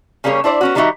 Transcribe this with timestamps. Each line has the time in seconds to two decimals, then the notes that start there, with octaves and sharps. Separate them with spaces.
0.24 C#3 G3 A#3 C#4 G#4 C#5
0.44 D4 E4 C5 D5
0.61 B3 C#4 F#4
0.75 D#3 G3 A#3 D#4 F#4 E5